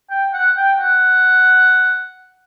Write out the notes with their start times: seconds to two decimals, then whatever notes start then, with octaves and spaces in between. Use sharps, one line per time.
0.10 G5
0.34 F#5
0.57 G5
0.80 F#5